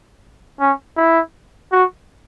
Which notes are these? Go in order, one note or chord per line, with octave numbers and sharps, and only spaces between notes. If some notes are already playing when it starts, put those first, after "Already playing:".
C#4
E4
F#4